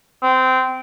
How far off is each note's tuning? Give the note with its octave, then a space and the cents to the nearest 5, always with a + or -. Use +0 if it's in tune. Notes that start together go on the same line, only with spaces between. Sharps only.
C4 -20